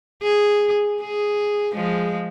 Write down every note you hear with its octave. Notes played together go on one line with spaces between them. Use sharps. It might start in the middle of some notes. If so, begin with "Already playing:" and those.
G#4
G#4
F3 G#3